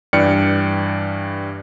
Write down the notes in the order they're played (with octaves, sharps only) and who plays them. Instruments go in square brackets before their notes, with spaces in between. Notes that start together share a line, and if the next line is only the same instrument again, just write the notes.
[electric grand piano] G2 E3 D5 G5 F6 C#7